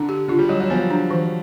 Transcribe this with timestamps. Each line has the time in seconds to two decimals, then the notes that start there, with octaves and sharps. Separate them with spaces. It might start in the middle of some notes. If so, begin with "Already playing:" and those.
Already playing: D3 D4
0.09 G4
0.28 D3 F4
0.39 G3
0.49 F#3 G3
0.60 F#3
0.70 F3 B3
0.90 D4
1.11 E3